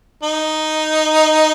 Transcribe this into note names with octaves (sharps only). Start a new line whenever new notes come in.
D#4